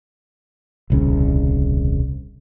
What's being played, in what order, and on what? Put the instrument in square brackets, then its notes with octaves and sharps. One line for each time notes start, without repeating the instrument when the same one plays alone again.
[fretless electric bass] D#1 C2 C#3